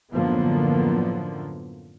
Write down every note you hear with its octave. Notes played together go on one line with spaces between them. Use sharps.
F#2 A2 D3 F3 A#3 B3